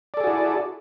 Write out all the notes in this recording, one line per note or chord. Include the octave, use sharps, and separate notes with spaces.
E4 F#4 G#4 A4 D5